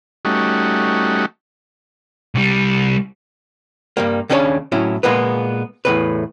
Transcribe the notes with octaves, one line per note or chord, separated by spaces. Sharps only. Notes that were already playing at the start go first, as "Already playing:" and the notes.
G3 A3 C#4 D#4 F#4
C2 G3
G2 G3 A#3
D#2 C#3 C#4 D4 G#4 C#5
A2 F#3 C#4 E4
A#2 G#3 A#3 B3 B4
E2 A2 B4